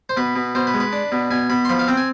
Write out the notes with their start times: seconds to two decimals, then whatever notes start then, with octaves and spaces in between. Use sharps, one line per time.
0.09 C5
0.17 B2 B4
0.36 B2
0.55 B2 C5
0.67 B4
0.74 G#3
0.80 B4
0.92 D4
1.12 B2
1.31 B2 G#5
1.50 B2 B5
1.65 C6
1.69 F3 B5
1.79 F5
1.88 C4 G5
1.97 G#5